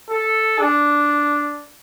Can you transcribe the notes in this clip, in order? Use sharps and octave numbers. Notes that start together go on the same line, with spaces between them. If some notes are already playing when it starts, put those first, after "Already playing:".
A4
D4